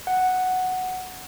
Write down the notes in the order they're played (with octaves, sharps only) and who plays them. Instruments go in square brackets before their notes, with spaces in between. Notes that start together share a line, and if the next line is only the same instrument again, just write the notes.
[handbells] F#5